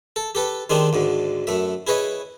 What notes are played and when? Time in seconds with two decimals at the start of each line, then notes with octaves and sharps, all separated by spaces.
0.16 A4
0.35 G4 A4 B4
0.70 D#3 G#3 C4 D4 D#4 G4
0.93 D2 G#2 D3
1.47 F#2 A3 E5
1.87 E4 G#4 B4 C#5 D#5